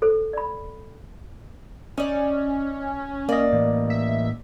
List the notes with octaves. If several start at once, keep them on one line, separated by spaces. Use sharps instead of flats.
A4 C5
D5 B5
C#4 D#4 D5
A#3 D5 D#5
A2 E3
E5